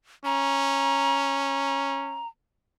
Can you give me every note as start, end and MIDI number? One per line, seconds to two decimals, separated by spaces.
0.25 2.22 61
0.25 2.27 82